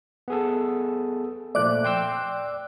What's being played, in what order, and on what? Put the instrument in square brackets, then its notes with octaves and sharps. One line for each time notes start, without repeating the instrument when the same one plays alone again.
[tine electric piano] B3 G#4 A4
[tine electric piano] A#2 F3 A3 [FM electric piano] D5 D6 F#6
[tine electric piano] G5 C6 E6